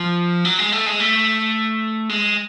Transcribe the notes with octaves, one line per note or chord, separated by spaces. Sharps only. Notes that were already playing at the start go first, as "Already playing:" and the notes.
Already playing: F3
F#3
G#3
A3
G#3
A3
G#3